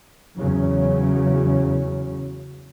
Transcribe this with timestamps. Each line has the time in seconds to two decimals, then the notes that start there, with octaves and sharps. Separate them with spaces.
0.37 E2 C#3 F#3 C#4